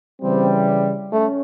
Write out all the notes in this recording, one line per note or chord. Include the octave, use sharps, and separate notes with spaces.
C#3 E3 G3 C4
A3 C#4